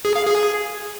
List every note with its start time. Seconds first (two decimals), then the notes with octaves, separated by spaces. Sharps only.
0.05 G#4
0.16 F5
0.27 G#4